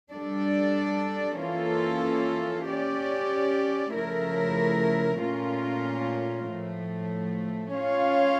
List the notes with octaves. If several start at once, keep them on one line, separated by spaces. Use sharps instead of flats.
G3 D4 A4 D5
E3 A#3 C#4 F4 A4
C#4 G4 D5
C#3 F3 A3 E4 A#4
A#2 A3 C#4 F4 A#4
A2 F3 A3
C#4 F4 C#5 F5